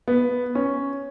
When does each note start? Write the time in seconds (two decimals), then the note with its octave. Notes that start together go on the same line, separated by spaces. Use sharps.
0.08 B3
0.55 C#4